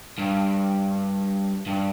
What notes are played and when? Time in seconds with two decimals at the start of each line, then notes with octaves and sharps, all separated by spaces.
0.18 G2
1.66 G2